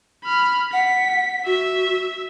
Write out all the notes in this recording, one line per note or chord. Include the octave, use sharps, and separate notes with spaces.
B5 F6
F#5 B6
F#4 E5